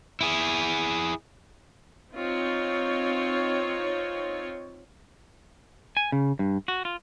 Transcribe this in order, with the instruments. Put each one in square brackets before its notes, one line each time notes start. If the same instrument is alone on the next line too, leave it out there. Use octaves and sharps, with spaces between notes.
[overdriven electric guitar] E4 G#4
[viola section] C4 D#4 F4 C#5
[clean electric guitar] G#5
C#3
G2
F#4
F4